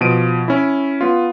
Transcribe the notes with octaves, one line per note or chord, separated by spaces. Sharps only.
B2 F3 D7 D#7
C#4 E4
B3 F4